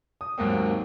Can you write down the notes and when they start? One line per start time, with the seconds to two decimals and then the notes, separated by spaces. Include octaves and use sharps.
0.21 D#6
0.38 D#2 G#2 F#3 A#3 C4